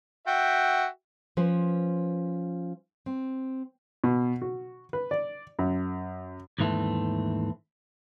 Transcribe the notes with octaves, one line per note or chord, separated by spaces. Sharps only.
F#4 E5 G5
F3 C#4 B4 C5
C4
B2
F#4
B4
D5
F#2
D#2 G#2 E3 A3 C4